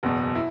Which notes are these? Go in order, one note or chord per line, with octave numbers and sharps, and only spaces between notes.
F#1 E2 B2
E4